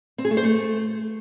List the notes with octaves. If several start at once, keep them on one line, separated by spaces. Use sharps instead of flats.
C4
G#4
A3
C5
A3